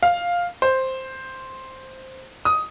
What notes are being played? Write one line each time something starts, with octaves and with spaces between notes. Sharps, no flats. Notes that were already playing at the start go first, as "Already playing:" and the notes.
F5
C5
D#6